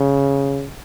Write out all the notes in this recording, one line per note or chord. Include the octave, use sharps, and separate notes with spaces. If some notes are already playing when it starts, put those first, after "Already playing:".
Already playing: C#3